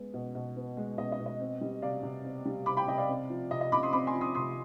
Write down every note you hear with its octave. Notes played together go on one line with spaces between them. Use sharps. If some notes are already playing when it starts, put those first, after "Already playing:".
Already playing: G#3 B3
B2
B2
B3
G#3
B2 D#5
D#5
B2
D#5
C4
G3
C3 D5 F5
C3
C4
G3
C3 B5 D6
G5 B5
C3 D#5 G5
D5 F5
C4
F3
C3 D#5
D#5
C3 B5 D6
C6 D#6
C4 B5 D6
G#5 C6
F3
C6 D#6
C3 C6 D#6